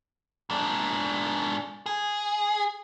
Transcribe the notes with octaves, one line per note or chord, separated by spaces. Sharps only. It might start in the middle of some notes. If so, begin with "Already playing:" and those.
G#2 D4
G#4